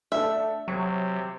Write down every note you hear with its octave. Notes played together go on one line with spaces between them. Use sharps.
A3 D4 A4 E5
C3 F#3 C#6